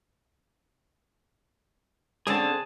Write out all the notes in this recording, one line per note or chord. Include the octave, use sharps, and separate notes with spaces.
D3 C4 C#4 G#4 A5